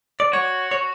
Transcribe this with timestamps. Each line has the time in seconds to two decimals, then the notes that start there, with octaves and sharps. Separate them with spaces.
0.20 D5
0.33 F#4 C#5
0.71 C#5